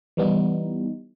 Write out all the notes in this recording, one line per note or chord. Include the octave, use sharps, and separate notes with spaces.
E3 G3 B3 D#4